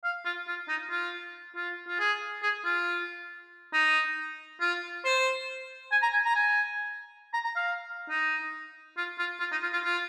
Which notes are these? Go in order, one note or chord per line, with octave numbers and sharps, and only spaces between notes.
F5
F4
F4
D#4
F4
F4
F4
G#4
G#4
F4
D#4
F4
C5
G#5
A#5
G#5
A#5
G#5
A#5
A#5
F5
D#4
F4
F4
F4
D#4
F4
F4
F4